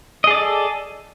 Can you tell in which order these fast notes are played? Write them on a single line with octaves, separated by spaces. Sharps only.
D#5 G#4 D5 A4